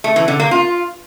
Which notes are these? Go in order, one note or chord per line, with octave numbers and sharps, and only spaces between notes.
A3
E3
D3
A#3
F4